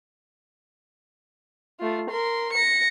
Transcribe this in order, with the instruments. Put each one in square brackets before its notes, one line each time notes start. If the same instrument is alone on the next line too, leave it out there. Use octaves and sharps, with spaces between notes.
[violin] A3 F4
A#4 C6
A#6 C#7